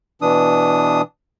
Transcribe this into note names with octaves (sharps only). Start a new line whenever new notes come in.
B2 E3 D4 D#6